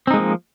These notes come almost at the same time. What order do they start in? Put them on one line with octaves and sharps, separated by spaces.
C4 D#4 G#3 A#3 F3